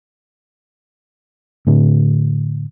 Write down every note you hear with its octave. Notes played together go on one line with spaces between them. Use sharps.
A2 D3